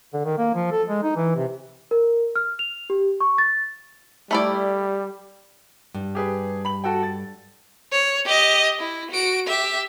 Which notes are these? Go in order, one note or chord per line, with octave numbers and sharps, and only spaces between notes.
D3
D#3
A#3
F3
A4
G#3
D#4
E3
C3
A#4
F6
F7
G4
C#6
A6
G3 A3 E4 D5
G2
G4 G#4 B4
B5 F#7
F#4 A4 G5
A6
C#5
G4 D#5
E4
F#4 D7
G4 E5